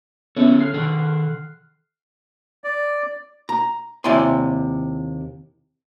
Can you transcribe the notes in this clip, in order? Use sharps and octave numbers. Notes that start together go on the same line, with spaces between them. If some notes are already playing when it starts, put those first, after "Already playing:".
D3 B3 C#4 E4 A4 C#5
F6 F#6 C7
D#3 A4
D5
A#5
D#2 C3 E4 D5 G#5 C6